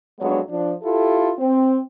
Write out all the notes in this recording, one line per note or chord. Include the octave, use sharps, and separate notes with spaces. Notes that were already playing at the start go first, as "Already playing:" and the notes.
F2 F#3 G#3 B3 D4 C#5
F3 D4
E4 F4 G4 A4
C4